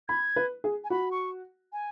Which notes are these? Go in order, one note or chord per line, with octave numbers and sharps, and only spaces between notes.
B5 G#6
B4
G#4
G#5
F#4 B5
C#6
G#5